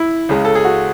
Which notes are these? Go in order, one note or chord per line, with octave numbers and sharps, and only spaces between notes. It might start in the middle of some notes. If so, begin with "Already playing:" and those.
Already playing: E4
C#2 C#3 G#3
A4
G#4
F#4